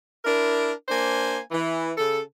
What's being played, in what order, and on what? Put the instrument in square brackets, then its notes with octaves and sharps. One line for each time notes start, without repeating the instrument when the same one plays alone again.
[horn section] D4 E4 A#4
A#3 D4 C5 G#5
E3
C#3 A4